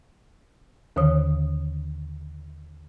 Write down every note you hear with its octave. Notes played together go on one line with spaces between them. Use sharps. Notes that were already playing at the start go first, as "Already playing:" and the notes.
D#2 D3 D#3 D#6